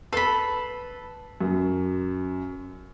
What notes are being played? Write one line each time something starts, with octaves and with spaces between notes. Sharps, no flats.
A4 B4 B5 C7
F#2